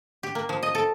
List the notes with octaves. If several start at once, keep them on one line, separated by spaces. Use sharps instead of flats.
G4
A#3
F3
D#5
A4